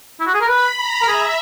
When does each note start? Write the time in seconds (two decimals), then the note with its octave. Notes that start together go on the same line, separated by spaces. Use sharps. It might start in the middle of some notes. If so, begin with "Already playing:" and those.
0.20 E4
0.27 F#4
0.34 G#4
0.41 A#4
0.48 B4 B5
0.77 A#5
1.02 A#4
1.07 G#4 E5